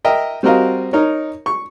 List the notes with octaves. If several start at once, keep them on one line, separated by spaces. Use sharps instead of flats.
A#4 D#5 E5 G5
G3 C4 F#4 A#4 D#5 F5
D#4 A#4 C#5
C#6